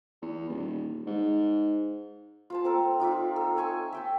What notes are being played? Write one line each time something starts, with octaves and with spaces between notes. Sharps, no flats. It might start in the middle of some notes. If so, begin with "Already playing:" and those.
E2
D#1
G#2
F4 C5 A5
C4 A4 A#4
D#4 F4 D5 E5
A4
C#5 G#5 C#6 E6
E5 G5 A5